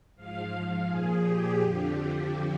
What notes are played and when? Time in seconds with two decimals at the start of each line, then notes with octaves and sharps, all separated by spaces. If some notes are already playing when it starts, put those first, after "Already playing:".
0.16 G#2 F3 F5
0.87 A#2 F3 G#4
1.23 G4
1.60 F2 D3 F3 G4
1.96 G4